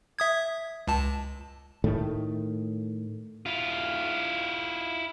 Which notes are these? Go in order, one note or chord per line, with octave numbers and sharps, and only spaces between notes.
E5 D#6 G#6
C#2 A5
A2 D#3 A3
E4 F4